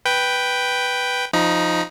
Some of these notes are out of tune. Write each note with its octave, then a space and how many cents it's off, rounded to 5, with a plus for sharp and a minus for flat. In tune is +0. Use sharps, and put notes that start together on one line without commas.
B4 +0 G5 +0
F3 +0 D#4 +0 A#5 +45